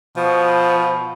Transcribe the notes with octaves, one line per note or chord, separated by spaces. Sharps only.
B2 F3